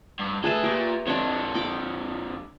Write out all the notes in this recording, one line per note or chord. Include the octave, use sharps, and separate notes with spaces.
G2
D2 G#4 A4 B4 E5
A#2 G4 C#6
F2 D3 D4 C#5
G5 B5 D6